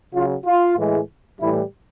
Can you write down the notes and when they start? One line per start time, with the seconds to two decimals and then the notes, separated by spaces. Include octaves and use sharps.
0.14 C#3 F#3 F4
0.46 F4
0.77 A2 E3 G#3
1.40 A2 E3 G3 E4